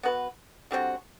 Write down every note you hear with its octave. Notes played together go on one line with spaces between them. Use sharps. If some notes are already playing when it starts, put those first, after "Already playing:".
B3 F#4 B4
D3 G3 C4 F#4